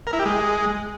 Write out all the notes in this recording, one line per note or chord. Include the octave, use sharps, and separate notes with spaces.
A#4
E4
G4
G#3